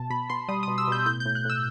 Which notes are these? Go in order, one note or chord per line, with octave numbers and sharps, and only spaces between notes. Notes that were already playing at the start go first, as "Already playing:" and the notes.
Already playing: B2 A5
B2 B5
B2 C6
G3 D#6
B2 D#6
E6
B2 G6
A2 G6
G6
A2
F#6
A2 E6